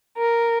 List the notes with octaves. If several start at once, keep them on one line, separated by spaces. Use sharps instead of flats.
A#4